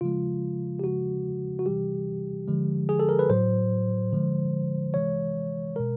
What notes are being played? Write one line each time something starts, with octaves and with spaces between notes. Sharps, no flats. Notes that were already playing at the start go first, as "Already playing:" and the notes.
C#3 F3 G#3 F4
G4
C#3 F3 G#3 F#4
F#4
C3 E3 G3 G4
D3 F3 G#3
G#4
A4
A#4
B4
A2 F#3 C5
D3 F3 G#3
C3 E3 G#3 C#5
B2 G#3 A#4